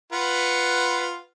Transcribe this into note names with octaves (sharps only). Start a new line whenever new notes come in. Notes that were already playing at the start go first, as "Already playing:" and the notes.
F4 B4 F#5